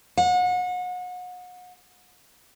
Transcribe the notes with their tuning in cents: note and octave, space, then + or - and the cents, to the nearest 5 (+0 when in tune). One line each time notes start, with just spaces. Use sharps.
F#5 -35